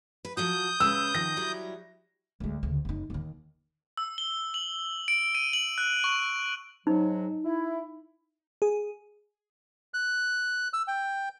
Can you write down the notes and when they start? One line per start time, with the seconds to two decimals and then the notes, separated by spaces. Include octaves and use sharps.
0.25 B4
0.37 F3 F#3 F#4 D#6 G6
0.80 C#3 G#3 B4 E6
1.15 D#3 F3 A#6
1.37 F#3 G3 E4
2.40 D2 G#3
2.63 D2 C#3
2.85 F#1 D#4
3.10 D#2 D#3
3.97 E6
4.18 G7
4.54 F#7
5.08 D7
5.35 D#7
5.53 F#7
5.78 F#6
6.04 C#6
6.87 G#2 F#3 D#4
7.44 E4
8.62 G#4
9.94 F#6
10.73 E6
10.88 G5